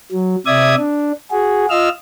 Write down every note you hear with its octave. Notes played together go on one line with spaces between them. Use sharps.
F#3
C3 D5 E5 D#6 G#6
D4
F#4 G#4
F4 D#5 F5 E6 F6